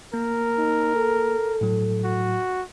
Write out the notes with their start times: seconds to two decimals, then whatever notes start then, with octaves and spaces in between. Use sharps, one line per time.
0.14 A#3 A#4
0.58 D#4
0.95 A4
1.61 A2 F#3
2.04 F#4